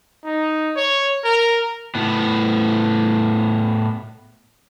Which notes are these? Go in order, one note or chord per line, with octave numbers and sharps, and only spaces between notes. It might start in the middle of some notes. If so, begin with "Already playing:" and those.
D#4
C#5
A#4
A2 B3